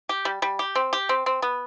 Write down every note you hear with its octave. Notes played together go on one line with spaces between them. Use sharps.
G4
G3
G3
G4
C4
G4
C4
C4
B3